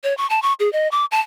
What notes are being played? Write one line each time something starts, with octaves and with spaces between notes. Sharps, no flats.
C#5
C#6
A5
C#6
G#4
D#5
D6
A5